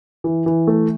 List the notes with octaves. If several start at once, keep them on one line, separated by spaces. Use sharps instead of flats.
E3
E3
A3